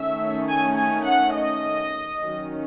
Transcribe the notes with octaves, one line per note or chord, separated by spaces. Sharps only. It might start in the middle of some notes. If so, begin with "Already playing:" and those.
Already playing: D#3 A3 C#4 E5
G#5
G#5
F#5
D#5
D#3 F#3 C#4